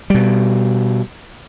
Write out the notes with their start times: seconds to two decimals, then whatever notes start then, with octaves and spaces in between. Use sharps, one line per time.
0.10 B2 G3